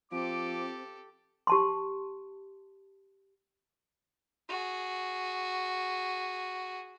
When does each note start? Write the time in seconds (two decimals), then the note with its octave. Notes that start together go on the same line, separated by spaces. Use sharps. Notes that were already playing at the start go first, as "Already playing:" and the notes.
0.12 F3 C4 G4 A4 D6
1.47 G4 A5 C6
4.49 F#4 G#4